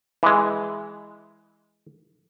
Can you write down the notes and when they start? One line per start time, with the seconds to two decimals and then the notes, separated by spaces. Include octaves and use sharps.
0.23 E3 G#3